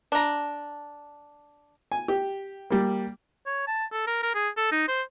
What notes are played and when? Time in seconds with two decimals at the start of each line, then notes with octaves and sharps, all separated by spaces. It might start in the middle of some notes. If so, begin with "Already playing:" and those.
0.12 D4 A#5
1.92 G#5
2.08 G4
2.70 G3 A#3
3.46 C#5
3.67 A5
3.92 A4
4.07 A#4
4.23 A#4
4.35 G#4
4.57 A4
4.72 D#4
4.88 C5